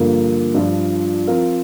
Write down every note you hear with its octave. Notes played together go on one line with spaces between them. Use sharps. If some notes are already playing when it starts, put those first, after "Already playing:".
Already playing: G2 D3 F3 A#3
G2 F3 D4 F4
F3 C4 F4 A#4